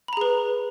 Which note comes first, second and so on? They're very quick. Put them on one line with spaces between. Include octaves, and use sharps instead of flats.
B5 A#5 G#4 B4